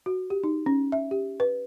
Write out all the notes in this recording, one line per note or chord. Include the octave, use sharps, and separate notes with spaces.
F#4
G4
D#4
C#4
E5
G4
B4